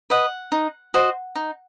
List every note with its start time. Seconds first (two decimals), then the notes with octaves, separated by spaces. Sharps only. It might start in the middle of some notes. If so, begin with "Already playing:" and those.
0.10 B4 D#5 F#5
0.52 D#4
0.94 F#4 C5 D#5
1.35 D#4